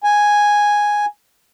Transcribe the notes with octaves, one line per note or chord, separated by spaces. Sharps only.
G#5